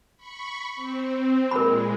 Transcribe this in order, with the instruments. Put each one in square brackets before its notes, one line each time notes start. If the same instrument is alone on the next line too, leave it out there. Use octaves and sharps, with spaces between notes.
[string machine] B5 C#6
C4
[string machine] A#2 G#3 [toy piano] A#4 B5